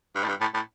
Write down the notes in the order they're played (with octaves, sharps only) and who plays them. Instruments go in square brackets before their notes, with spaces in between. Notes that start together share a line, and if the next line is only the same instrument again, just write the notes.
[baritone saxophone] G2
A2
G2
A2
A2